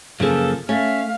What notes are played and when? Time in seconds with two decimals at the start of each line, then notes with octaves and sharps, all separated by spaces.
0.20 F#2 C#3 F3 A#3 G#4 A4
0.69 A3 C#4 E5 F5